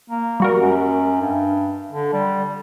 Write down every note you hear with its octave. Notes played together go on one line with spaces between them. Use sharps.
A#3
G3 F#4 A#4
F#2
G2
D3
G3